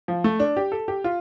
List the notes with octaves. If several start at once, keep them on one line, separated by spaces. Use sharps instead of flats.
F3
A3
D4
G4
A4
G4
F4